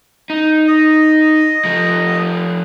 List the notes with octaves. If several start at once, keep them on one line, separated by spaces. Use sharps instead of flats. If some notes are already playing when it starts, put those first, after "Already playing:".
D#4
D#5
F3 A3